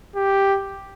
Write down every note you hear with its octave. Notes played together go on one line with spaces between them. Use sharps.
G4